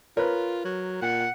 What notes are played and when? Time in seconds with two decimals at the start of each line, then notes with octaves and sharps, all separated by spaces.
0.17 F4 A#4 B4 C#5
0.65 F#3
1.02 A#2 F#5